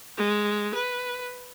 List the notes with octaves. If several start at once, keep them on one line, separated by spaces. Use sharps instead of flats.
G#3
B4